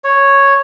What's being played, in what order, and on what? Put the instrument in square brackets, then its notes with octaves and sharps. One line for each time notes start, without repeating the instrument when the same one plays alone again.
[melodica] C#5